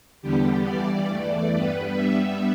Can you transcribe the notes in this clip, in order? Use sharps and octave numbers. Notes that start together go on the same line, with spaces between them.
E2 D3 G3 B3 G4
G2 E3 G3 D5
E2 E3 A3 D5
G2 G3 B3 B4
G2 G3 B3 E5